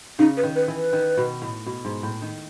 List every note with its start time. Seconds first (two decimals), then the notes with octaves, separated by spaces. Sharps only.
0.19 C#3 D#4
0.37 B4
0.43 D#3
0.56 B4
0.68 E3
0.74 B4
0.93 D#3
1.17 B2
1.42 A2
1.66 B2
1.85 G#2
2.03 A2
2.22 D#3